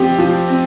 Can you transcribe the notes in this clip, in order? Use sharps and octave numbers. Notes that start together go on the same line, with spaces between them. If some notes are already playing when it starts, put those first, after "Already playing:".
Already playing: F3 C4 G4
F3
C4